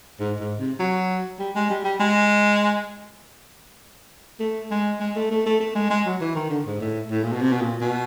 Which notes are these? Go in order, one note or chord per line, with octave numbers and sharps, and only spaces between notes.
G#2
G#2
C3
F#3
G3
G#3
G3
G3
G#3
A3
G#3
G#3
A3
A3
A3
A3
G#3
G#3
F#3
E3
D#3
D3
G#2
A2
A2
A#2
B2
C3
B2
A#2
B2